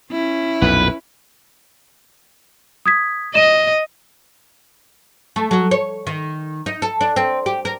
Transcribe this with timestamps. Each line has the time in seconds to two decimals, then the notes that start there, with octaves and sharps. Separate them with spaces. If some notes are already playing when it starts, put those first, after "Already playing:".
0.11 C#4 E4
0.62 B1 F2 A#2 B4
2.86 D#6 G#6 B6
3.35 D#5 D#7 E7
5.36 A3
5.51 F#3
5.71 C#5
6.07 D#3
6.66 D#4
6.82 A4
7.01 D4
7.16 C4
7.46 G4
7.65 A#4